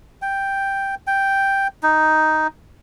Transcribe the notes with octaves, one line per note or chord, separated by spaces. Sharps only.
G5
G5
D#4